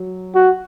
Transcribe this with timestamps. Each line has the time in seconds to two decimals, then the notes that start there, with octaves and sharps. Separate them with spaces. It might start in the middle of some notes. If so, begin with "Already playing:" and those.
Already playing: F#3
0.35 F#4